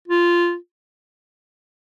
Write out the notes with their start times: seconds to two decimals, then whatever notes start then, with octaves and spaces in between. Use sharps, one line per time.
0.08 F4